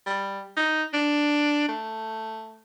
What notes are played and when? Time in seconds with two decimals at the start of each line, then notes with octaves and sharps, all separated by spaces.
0.06 G3
0.56 D#4
0.94 D4
1.68 A3